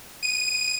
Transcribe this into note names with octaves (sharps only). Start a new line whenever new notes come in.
D#7